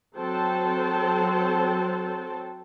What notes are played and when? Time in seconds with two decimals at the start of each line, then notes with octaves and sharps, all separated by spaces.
0.17 F#3 C4 A4 C5 G5 A5